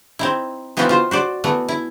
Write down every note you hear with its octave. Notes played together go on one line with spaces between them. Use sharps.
C4 D#4 E4
E3 B3 C4 D#4 F4 F#4
F4 C5
F#4 C5 D5
E3 A3 B3
E4